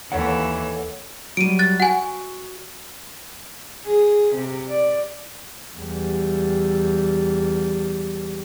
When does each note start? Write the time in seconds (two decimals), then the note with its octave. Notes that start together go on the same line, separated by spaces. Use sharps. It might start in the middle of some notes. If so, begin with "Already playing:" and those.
0.12 D#2 E3 A4 C#5 F#5
1.37 F#3 G3 D7 D#7
1.59 F#6 A6
1.80 F#4 F#5 G#5
3.86 G#4
4.35 C3
4.69 D5
5.77 E2 G3